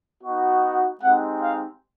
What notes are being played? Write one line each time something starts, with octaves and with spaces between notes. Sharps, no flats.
B3 D#4 F#4
G#3 C4 D#4 G4 F#5
F5